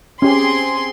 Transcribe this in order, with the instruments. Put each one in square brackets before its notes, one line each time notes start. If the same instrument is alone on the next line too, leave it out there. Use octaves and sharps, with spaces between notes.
[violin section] C4 G#4 C6 [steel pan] C#4 G4